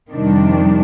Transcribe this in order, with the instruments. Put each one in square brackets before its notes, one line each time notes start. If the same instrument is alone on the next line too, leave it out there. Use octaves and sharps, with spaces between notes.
[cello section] F2 C3 D#3 G3 D4